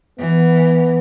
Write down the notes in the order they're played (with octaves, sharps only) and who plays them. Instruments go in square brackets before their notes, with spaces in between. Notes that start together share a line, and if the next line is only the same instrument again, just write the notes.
[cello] E3 [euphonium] B3